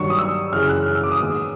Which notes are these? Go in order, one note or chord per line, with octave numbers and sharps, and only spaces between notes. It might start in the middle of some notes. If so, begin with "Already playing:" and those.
Already playing: G2 D#3 F#3 C#6
D#6
E6
F#2 C#3 E3 F6
F#6
F6
E6
D6
D#6
G#2 D#3 G#3 B3